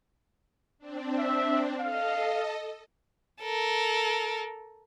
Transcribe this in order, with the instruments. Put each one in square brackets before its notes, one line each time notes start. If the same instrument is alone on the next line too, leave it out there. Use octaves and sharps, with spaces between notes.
[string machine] C4 D4
[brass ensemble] E5
[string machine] A4 D#5 [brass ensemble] F5
[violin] A4 A#4